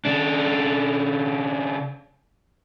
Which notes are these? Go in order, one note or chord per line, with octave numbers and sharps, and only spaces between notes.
C#3 D4